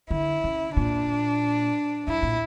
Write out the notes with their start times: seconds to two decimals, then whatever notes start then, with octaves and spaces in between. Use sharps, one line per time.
0.11 D3 E4
0.44 C#3
0.76 A#2 D4
2.06 G2 E4
2.23 A#2